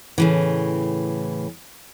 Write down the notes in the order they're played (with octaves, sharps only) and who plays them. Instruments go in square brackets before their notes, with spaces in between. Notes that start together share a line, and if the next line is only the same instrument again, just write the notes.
[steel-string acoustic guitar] A2 C#3 E3